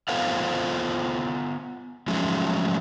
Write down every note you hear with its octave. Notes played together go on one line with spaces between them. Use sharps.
B3 F4 A4 C5 F5 F#5
F3 F#3 G#3 A3 C#4 G#4